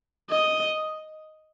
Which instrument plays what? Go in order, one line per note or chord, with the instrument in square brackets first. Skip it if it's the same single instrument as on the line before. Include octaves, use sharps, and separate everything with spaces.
[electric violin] D#5